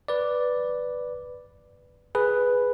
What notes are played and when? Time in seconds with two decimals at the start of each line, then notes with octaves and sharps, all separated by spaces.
0.08 B4 D5
2.15 G#4 B4